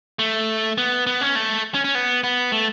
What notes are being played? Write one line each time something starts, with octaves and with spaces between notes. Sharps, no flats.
A3
B3
B3
C#4
A3
C#4
C#4
B3
B3
A3